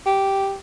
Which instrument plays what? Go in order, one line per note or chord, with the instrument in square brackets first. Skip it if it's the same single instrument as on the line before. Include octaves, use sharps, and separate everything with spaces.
[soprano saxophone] G4